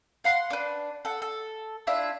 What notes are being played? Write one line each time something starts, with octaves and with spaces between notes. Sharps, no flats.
F5 F#5 C6
D4 B4
A4 F#5
A4
D4 E4 F4 E5